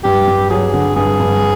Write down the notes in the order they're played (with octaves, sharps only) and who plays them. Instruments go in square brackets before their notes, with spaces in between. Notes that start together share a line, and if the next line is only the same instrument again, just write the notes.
[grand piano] G2 [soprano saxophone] G4
[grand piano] G2
[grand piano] F#3 [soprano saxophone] G#4
[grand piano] D3
[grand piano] G2 [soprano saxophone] G#4
[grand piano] G2